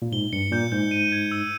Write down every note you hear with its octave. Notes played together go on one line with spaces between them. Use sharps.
A#2
G#2 G7
G2 C#7
A#2 G6
G#2 G6
D#7
G#6
E6